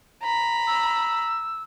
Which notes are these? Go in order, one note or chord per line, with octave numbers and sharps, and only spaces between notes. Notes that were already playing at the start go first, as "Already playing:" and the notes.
A#5 B5
E6